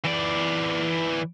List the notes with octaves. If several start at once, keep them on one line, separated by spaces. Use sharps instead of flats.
E3 D5